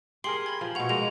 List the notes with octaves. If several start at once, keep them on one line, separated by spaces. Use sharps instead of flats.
G4 G#4 A#4 C6 C7 F#7
B5 G#6
F3
B2 C#5 F#5 F7
G#3 A#3 D#5 F7